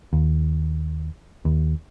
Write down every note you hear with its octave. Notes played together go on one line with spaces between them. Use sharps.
D#2
D#2